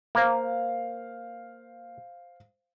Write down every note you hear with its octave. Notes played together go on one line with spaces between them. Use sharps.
A#3 C5 F5